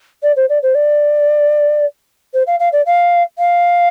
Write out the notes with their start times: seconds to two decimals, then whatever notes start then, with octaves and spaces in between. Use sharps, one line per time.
0.23 D5
0.36 C5
0.49 D5
0.62 C5
0.74 D5
2.33 C5
2.47 F5
2.59 F5
2.72 D5
2.86 F5
3.38 F5